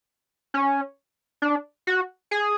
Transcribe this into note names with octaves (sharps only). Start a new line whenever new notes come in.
C#4
D4
F#4
G#4